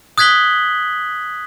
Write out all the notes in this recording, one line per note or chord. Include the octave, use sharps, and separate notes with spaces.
D#6 F#6 G#6 B6 F#7 G7